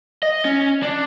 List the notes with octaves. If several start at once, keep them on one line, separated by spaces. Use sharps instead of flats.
D#5
C#4
D4